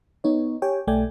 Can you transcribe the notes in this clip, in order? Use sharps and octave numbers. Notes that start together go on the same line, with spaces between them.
B3 D#4 C#5
G4 C#5 G5 G#5
B1 A3 D5 G5 G#5